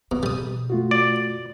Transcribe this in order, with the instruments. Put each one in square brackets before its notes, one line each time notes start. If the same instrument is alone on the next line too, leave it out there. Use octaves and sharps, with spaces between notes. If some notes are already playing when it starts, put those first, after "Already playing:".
[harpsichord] B2 [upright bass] C4
[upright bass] B2 [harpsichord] G3 D#6
[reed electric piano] A3 F4 F#4
[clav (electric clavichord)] D5